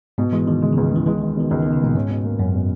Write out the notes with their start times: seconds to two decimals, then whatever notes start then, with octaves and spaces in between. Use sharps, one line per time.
0.18 G#2 B2
0.32 E3 G#3
0.47 B2 D#3
0.62 C#3 G#3
0.73 C#3
0.77 C#2
0.92 C#2 E3
1.06 E3 G#3
1.18 D#3
1.22 G#3
1.37 B2 D#3
1.50 C#2 D#3
1.63 D#3
1.66 B2
1.73 C#3
1.81 A#2 G#3
1.95 G#2 C#4
2.10 B2
2.25 A#3
2.39 F#2 C#4
2.54 B2